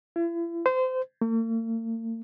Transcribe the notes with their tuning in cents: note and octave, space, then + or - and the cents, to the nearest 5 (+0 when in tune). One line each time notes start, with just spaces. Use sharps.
E4 +40
C5 -25
A#3 -45